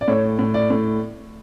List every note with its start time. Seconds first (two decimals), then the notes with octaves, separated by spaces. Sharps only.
0.01 D5
0.08 A2 C#5
0.39 A2
0.54 D5
0.70 A2